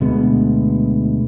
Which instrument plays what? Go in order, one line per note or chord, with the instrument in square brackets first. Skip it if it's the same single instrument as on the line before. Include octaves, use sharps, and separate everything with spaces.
[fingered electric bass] D2 B2 G#3 B3